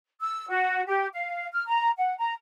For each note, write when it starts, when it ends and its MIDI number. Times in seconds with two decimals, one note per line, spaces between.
0.20 0.46 88
0.49 0.82 66
0.87 1.07 67
1.14 1.47 77
1.52 1.62 89
1.66 1.89 82
1.97 2.14 78
2.18 2.32 82